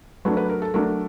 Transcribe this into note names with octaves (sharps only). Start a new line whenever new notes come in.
F#3 A3 D4 B4
B4
A#4
A4
F#3 A3 D4 A#4